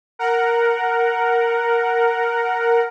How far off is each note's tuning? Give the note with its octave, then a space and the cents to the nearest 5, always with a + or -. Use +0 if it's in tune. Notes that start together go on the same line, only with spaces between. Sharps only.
A#4 +0 F#5 +0